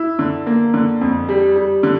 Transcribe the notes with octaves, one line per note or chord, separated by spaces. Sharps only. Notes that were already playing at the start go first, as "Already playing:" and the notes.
Already playing: E4
D3
A#3
D3
F2
G3
G3
D3